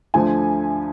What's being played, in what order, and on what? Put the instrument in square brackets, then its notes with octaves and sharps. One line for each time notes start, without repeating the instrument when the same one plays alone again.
[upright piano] D2 D3 F3 A3 G#5